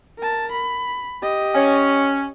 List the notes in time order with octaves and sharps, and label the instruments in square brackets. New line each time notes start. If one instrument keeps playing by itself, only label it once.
[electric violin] A#4 A5
B5
G4 D#5
[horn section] C#4